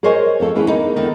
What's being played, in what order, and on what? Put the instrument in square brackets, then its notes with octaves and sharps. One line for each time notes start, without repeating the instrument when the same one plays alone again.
[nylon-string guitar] G#4 A#4 C5 C#5 D#5 G#5
F2 A4
E3 C#4 E4 G#4
A#3 B3 D#4
E2 D3 D#3